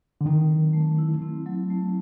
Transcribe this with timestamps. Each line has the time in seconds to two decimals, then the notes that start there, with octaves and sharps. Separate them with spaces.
0.21 D3
0.25 D#3 C4
0.50 F#3
0.73 A3
0.98 E4
1.22 C4
1.46 F#3
1.70 A3